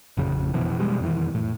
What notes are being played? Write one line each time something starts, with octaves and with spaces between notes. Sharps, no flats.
A1 F2 C#3
B2 E3 F3
B2 G3 G#3
F2 D#3 E3
A2